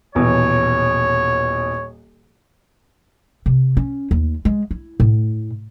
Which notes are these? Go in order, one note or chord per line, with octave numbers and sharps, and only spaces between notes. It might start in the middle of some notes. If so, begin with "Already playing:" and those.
D#1 B2 E3 C#5
C3
C#4
D#2
G#3
E4
A2